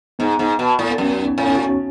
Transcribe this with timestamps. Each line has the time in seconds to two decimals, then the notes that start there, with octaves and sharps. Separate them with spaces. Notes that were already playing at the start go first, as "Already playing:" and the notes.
0.19 G#2 B3
0.39 G#2
0.59 B2
0.79 A2
0.91 B3
0.98 F#2 C#4
1.19 D#4
1.38 A2 C#4
1.57 F#4